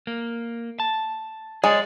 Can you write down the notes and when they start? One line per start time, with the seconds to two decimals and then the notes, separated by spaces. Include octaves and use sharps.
0.07 A#3
0.80 A5
1.64 G#3 G#4 C#5 D5